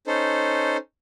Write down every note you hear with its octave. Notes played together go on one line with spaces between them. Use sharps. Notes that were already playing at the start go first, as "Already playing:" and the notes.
C#4 D#4 A4 C5